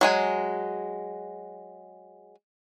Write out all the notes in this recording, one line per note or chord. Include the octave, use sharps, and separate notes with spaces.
F#3 G#3 G#5